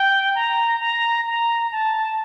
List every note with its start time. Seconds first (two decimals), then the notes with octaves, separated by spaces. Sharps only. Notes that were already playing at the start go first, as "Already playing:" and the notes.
Already playing: G5
0.35 A#5
0.80 A#5
1.26 A#5
1.72 A5